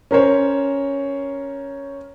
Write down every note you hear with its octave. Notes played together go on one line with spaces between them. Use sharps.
C#4 A#4 C5 C#5